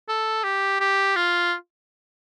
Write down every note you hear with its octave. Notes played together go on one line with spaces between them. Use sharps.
A4
G4
G4
F4